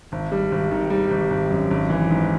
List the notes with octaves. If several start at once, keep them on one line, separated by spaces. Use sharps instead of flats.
G#1
G3
G#1
D#3
G3
G#1
G#1
F#2
G#1
E3
G#2